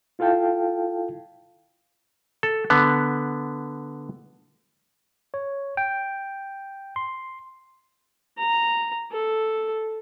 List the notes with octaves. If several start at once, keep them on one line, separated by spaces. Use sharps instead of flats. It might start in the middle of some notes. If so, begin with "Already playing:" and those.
E4 F4 A4 F5 G5 A5
A4
D3 B3
C#5
G5
C6
A#5
A4